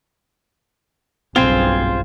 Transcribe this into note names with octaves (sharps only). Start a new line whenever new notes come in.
F#1 B1 G2 C4 F4 G#4 C5